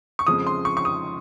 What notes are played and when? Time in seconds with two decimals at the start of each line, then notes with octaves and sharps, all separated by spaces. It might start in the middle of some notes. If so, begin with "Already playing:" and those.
0.19 C#6
0.27 F2 C#3 F3 G#3 D#6
0.47 C6
0.65 C#6
0.77 C#6
0.85 D#6